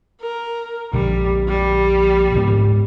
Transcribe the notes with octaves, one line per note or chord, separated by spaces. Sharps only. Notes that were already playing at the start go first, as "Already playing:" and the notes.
A#4
A#1 D3 G3
G3
D2 G#2 B3